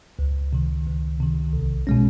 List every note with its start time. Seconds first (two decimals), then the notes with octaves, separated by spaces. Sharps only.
0.19 C#2
0.53 C3 D#3
0.86 C#2
1.20 C3 D#3
1.53 B1
1.87 B2 G#3 C#4